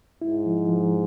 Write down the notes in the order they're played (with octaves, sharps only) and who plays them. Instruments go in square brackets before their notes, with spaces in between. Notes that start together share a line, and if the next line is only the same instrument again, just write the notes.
[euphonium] G#2 [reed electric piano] E4
[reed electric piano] F3
F3